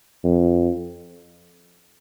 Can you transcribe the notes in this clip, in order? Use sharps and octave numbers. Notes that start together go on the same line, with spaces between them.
F2